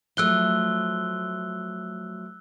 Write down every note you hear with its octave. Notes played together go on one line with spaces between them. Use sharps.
F3 F#3 A3 E6 F#6 G7